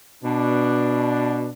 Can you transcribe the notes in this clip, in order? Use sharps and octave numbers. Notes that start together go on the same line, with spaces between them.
B2 D4